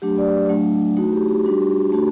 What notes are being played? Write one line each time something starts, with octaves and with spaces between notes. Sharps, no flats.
F#3 A3 D4 G4
D5
F#3 A3 D4
A3 D#4 F#4
G4
G4
G3 D4 F#4 G4
A3 D4 F#4